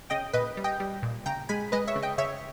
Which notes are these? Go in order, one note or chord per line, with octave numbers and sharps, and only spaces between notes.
C#3 D#5 G5
A#2 B4 D#5
G3
D#5 G5
G3
A#2
C#3 G5 A#5
G#3 G#5 B5
G#3 B4 D#5
C#5 E5
C#3
D#5 G5
C#3 C#5 E5